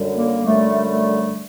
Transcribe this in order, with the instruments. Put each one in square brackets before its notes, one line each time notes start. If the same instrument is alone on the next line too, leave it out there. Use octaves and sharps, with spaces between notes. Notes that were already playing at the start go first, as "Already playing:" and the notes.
Already playing: [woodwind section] F#2 D3 G3
A#3
F#2 D3 G3 A3
A3